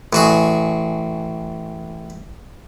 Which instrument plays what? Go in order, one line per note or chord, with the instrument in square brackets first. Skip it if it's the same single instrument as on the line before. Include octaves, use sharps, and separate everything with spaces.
[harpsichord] A1 F#4 G#4